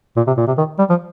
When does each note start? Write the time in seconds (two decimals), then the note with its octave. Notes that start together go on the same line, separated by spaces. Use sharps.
0.17 A#2
0.27 C3
0.37 A#2
0.47 C3
0.58 D#3
0.79 G3
0.89 F3